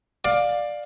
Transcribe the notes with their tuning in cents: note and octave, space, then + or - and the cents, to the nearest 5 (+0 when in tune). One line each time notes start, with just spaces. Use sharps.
D5 +10 F5 +15